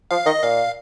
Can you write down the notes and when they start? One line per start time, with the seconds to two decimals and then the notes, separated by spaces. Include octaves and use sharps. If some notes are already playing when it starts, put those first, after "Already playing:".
0.11 F3 F5
0.26 D#3 D#5
0.42 A#2 F5